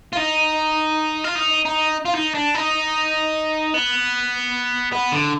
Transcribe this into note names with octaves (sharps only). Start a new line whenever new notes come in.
F4
D#4
F4
D#4
D#4
F4
D#4
D4
D#4
B3
B3
D3